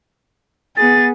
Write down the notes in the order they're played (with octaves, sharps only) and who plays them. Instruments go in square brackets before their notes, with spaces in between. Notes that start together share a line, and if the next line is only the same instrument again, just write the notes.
[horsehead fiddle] B3 G#4 [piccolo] A6